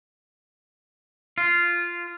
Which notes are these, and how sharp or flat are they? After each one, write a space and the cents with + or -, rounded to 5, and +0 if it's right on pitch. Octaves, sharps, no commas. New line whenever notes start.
F4 -10